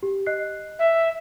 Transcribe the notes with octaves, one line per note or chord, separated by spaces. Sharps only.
G4
D#5 F#6 C7
E5